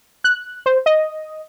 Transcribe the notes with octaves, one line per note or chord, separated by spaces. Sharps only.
F#6
C5
D#5